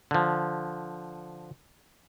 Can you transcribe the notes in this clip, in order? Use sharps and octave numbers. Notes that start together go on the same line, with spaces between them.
D3 F3